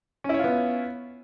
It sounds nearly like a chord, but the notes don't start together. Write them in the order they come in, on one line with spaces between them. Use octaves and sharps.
C#4 E4 C#5 F4 B3